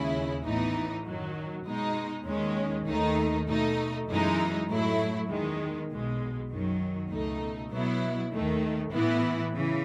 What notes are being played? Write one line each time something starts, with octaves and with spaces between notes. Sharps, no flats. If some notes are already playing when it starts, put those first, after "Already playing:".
Already playing: D#2 C#3 G#3 C#4 E4
A1 A2 E3 B3 D#4
F#2 D#3 F#3
B2 G#3 D#4
D#2 D#3 G#3 C#4
D#2 D#3 A3 D#4
B2 A3 D#4
F#2 E3 G#3 D#4
A2 F#3 A3 E4
E2 D#3 G#3
B1 B2 G#3
F#2 D#3 F#3
C#2 B2 A3 D#4
B2 F#3 B3 E4
D#2 D#3 A3
A2 E3 B3 E4
C#3 E3